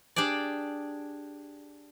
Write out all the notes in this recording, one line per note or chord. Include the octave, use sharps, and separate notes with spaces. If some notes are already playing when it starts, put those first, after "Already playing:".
D4 G4 G#4 D5